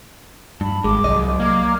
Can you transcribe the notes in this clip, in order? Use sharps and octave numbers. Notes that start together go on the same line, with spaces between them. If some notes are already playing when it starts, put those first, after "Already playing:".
G2 A5 B5
G#1 G#3 D6
C2 F#3 D5 D#5
A#3 D6 F6 G#6